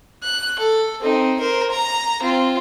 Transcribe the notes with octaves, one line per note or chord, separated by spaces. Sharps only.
F#6
A4
C4 D#4
A#4 C5
A#5
C4 F4